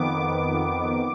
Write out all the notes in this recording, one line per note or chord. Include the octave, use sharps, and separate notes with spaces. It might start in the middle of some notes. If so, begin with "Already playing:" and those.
Already playing: F2 D#3 B3 D6